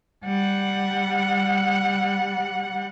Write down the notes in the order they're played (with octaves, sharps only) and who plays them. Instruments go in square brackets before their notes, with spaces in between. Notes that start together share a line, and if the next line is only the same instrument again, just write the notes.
[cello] G3 F#5